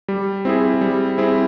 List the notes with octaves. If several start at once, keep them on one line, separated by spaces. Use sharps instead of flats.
G3
C4 E4 G#4
G3
C4 E4 G#4